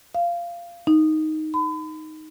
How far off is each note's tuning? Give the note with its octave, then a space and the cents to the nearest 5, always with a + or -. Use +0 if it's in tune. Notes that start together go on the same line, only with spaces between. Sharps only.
F5 -15
D#4 +5
B5 +40